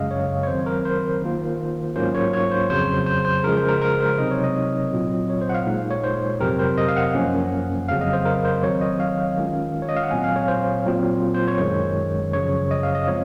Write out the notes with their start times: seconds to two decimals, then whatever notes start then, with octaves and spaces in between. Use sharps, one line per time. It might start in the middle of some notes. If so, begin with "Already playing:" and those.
Already playing: F#2 C#3 G#3 D#5 F5
0.11 C#5
0.43 C#5
0.47 D#3 F#3 C4 C5
0.66 A#4
0.85 C5
1.22 D#3 A#3 F4
1.96 G#2 F#3 A#3 C#4 F4 C5
2.15 C#5
2.33 C#5
2.52 C5
2.70 F2 C#3 F#3 C5
3.06 C5
3.25 C5
3.44 C#3 F3 G#3 A#4
3.57 C5
3.69 A#4
3.81 A#4
4.00 C5
4.18 C3 F#3 C4 D#4 D#5
4.31 C#5
4.44 D#5
4.92 A#2 F#3 C4 F4
5.30 C#5
5.41 C5
5.49 F#5
5.54 F5
5.67 A#2 G#3 D#4
5.91 C#5
6.03 C5
6.40 F2 C3 F#3 C4 A#4
6.59 C5
6.77 D#5
6.88 F5
6.96 F#5
7.15 F#2 F3 A#3 C#4
7.88 F2 C#3 F#3 F5
8.01 D#5
8.13 C5
8.25 A#4
8.45 C5
8.63 D#3 F#3 C4 C#5
8.81 D#5
9.00 F5
9.37 D#3 G#3 C#4 F4
9.82 C#5
9.89 D#5
9.96 F5
10.03 F#5
10.11 A#2 F#3 C4 G#5
10.24 F5
10.36 C#5
10.48 C5
10.86 A#2 F#3 C4 F4
11.34 C5
11.48 C#5
11.59 F#2 D#3 G#3
12.33 F#2 C#3 F3 C#5
12.71 D#5
12.83 F5
12.95 D#5
13.08 F3 G#3 C4 C#5